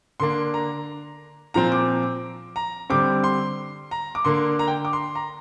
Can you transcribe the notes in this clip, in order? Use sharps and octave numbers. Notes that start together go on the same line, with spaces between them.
D3 A#3 D4 C6
A#5
A#2 F3 C4 A#5
D6
A#5
D3 G3 C4 D6
C6
A#5
D6
D3 A#3 D4 C6
A#5
G5
D6
C6
A#5